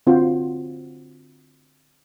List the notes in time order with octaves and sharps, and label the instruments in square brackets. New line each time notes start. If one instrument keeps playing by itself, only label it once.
[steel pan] D3 C4 F4 F#4 C5